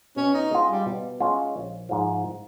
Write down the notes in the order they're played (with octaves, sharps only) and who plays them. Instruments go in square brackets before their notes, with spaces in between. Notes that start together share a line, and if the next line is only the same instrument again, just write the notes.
[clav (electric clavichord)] B2 [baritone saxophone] C#4
[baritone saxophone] D#4
[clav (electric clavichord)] G#3 C#4 F4
[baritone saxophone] G3
[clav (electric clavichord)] B2
G#3 C#4 F4
A#1
G#2 F3